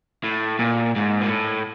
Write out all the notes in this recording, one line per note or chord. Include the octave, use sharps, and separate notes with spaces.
A2
A#2
G#2
A#2
A2